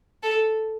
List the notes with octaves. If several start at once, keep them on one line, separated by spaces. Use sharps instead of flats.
A4